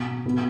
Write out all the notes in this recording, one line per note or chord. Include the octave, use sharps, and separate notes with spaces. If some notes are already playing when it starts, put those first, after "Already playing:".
Already playing: B2
B2 B3